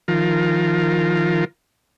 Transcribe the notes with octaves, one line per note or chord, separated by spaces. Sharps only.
D#3 F3 F4 A#4